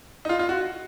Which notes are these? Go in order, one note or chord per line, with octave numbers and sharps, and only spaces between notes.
D#4
F4
F4
F#4